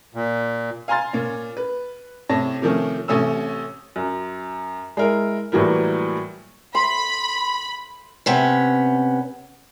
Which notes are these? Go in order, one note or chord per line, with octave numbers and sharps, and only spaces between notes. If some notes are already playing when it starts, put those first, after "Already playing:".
A#2
F5 G#5 A#5 C6 F6 A6
A#2 C#4
B4
A2 C3 C#5 A5 A#6
C3 D#3 F3 A3 C#4
A1 C3 A3 C#4 D#6 E6
F#2
G#3 E4 A#4
A2 E3 F#3 G3 A#3
B5 C6
C3 B3 C#4